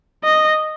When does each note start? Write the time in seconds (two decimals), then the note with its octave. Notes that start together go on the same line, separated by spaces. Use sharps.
0.24 D#5